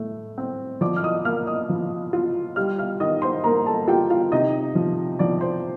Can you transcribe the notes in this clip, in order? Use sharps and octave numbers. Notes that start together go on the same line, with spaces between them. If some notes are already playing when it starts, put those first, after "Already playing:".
Already playing: A2 A3
C4
F3 D5 D6
F6
D#5 D#6
A#3 F5 F6
D#5 D#6
F3
F4
G3 F5 F6
F5 F6
D#3 D#5 D#6
C5 C6
A#3 A#4 A#5
A4 A5
F4 G4 G5
F4 F5
C3 D#4 D#5
F3
F3 D5
C5